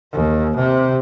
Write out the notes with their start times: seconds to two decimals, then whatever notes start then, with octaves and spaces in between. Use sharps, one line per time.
0.13 D#2
0.56 C3